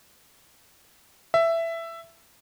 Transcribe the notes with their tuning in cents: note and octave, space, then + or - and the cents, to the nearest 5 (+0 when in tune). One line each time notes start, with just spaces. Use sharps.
E5 +10